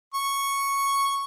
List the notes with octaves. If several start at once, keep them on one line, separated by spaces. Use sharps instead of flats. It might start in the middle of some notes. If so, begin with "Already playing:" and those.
C#6